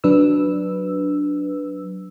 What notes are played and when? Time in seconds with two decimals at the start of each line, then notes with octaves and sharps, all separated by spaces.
0.04 F#3 D4 B4 E6